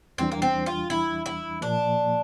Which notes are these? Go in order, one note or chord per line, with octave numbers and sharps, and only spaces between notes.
E2 E3 G3 C4 D4
A#3
C4
F4
E4
E4
A#2 F3 A#3 D4